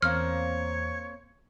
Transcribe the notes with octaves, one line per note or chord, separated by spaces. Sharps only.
E2 A#3 C4 C5 C#5 F6